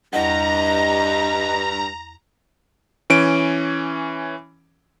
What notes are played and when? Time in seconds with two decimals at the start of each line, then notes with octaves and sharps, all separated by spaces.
0.13 E2 G2 D#5 F#5 A#5
3.10 E3 C#4 D7